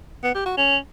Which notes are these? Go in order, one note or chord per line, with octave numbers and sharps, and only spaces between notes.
B3
G4
F#4
C#4